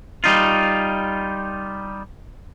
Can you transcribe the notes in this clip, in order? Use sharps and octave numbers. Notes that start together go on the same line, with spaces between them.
G3 D#4 F4